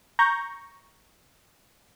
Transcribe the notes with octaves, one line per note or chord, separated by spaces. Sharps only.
A#5 C#6 G6 A#6